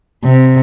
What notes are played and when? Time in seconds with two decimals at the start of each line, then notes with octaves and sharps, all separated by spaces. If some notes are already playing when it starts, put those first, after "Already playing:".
0.24 C3